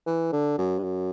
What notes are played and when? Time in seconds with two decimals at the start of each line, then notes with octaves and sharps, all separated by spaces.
0.06 E3
0.32 D3
0.58 F#2
0.78 G2
0.83 F#2